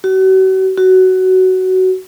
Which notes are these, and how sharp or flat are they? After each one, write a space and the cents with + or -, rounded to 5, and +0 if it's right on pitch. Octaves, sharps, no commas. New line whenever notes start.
F#4 +40
F#4 +15